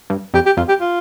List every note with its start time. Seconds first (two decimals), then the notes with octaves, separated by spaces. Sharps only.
0.10 G2
0.34 F2 G4
0.46 G4
0.57 F2 F4
0.68 G4
0.81 F4